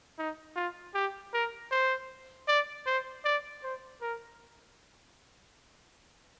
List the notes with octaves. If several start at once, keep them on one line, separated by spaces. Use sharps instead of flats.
D#4
F4
G4
A#4
C5
D5
C5
D5
C5
A#4